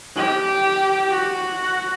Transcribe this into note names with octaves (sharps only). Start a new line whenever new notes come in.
G4
F#4